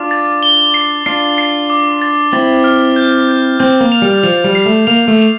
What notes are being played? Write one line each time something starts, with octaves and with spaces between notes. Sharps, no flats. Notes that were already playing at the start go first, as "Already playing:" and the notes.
Already playing: D4 F4 D6
A6
G7
C7
D4 F4 C7
C7
D6
A6
C4 E4 A6
F6
G6
G6
C4 G6
A#3
F7
G3
F3 F7
G3
C7
A3
A#3 F7
A3
F7